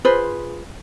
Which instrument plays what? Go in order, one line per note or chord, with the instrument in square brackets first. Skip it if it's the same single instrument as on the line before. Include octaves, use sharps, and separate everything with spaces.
[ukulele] F4 G#4 B4 C5